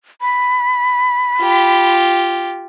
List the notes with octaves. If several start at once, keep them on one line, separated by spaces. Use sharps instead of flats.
B5
F4 G4